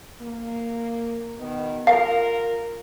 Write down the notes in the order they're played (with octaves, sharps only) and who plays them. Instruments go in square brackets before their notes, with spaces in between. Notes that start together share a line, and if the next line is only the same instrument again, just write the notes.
[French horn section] A#3
B2 D#3 B3
[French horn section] F4 A#4 [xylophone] F5